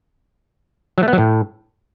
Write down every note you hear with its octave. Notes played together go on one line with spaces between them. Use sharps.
F#3
A3
B3
F#3
A2